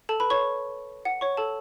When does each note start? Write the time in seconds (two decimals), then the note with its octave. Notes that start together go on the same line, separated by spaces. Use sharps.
0.09 A4 A5
0.20 B4 B5
0.30 C#5 C#6
1.05 F#5
1.21 C#5 C#6
1.37 A4 A5